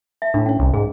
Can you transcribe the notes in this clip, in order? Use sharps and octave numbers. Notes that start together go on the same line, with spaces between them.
E5
A2 D4
C#4 C#5
C2
G#2 G#4